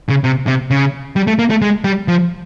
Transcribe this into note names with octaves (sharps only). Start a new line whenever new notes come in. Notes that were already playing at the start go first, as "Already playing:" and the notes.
C#3
C3
C3
C#3
G3
A3
A#3
A3
G#3
G3
F3